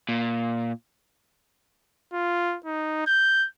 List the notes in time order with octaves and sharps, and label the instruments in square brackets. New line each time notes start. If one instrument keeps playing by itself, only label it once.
[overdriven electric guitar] A#2
[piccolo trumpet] F4
D#4
G6